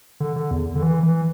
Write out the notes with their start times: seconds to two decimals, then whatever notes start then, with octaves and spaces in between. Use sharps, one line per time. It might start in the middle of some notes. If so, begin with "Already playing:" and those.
0.20 D3
0.36 D3
0.51 E2
0.75 D3
0.82 E3
1.03 E3